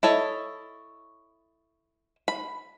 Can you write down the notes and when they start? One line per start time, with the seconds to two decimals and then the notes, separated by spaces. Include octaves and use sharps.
0.03 E4 A4 C#5 D#5
2.28 B5